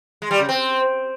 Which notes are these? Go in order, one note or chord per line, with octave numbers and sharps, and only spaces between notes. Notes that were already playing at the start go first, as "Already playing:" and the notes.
G#3
G3
C#3
C4